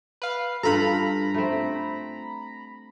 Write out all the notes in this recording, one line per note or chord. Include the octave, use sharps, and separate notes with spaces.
B4 F5
G2 F4 A4 A#5 B5
A3 C4